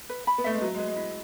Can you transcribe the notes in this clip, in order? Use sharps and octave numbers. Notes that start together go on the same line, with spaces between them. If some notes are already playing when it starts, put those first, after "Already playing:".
B4
B5
B3
A3 E5
G#3
F#3 B4
G#3
B4
G#3
E4